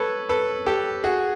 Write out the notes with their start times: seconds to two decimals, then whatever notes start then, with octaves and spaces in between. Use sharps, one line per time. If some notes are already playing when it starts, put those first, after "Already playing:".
Already playing: A4 B4 C#5
0.29 A4 B4
0.66 G4 A4
1.04 F#4 G#4